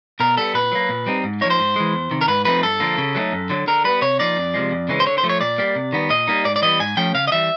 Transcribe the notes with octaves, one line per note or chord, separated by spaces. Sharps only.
B2 A#4
G3 B3 A4
A#2 B4
F#3 A#3
A#2
G3 C4 D#4
G#2
F3 A#3 D#4 C#5
C5
G#2
E3 G#3
E2
C3 D#3
A#4
G#2 B4
F3 A3 C4 D#4 B4
G2 A4
D3 F3 A#3
C#3
F#3 A3 C4 D#4
F#2
D3 F#3
D3 A#4
G3 B3 B4
C3 C#5
F3 A#3 D#4 D5
F2
C3 F3 G#3
F2
C#3 E3 G#3 C#4
C5
D3 C#5
C5
F3 A3
C#5
A#2 D5
G3 A#3
C3
D#3 G3 B3
A#2 D#5
G3 A#3 D#4
G#2 D5
D5
E3 G3 B3 D#5
G#2 G#5
F3 A3 C#4 G5
C#3 F5
D#5
E3 G3 E5